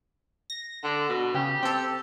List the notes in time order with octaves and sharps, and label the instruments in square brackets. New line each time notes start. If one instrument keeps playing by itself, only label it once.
[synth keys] A#6
[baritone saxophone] D3
B2
[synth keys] C#3 [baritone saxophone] G4
[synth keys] C4 A4